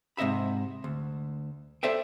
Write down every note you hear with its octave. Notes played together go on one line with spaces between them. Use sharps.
G#2 C3 D#5 E5 B5
D2
A4 C5 D5 E5 G5